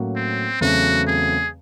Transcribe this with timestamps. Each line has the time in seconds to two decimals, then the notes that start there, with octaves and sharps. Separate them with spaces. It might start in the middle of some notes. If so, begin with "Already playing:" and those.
Already playing: A2 F#3 A#3 C#4 F#4
0.16 C4
0.61 E2 C#3 F#3 A3 C4 F#4
1.07 G#4